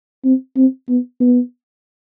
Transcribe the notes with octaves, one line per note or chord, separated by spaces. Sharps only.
C4
C4
B3
B3